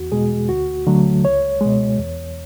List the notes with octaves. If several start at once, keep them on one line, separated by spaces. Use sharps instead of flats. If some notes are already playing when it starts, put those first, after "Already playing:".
Already playing: E2 F#4
B2 G#3 G#4
D2 F#4
D3 F#3 A3
C#2 C#5
B2 G#3
E2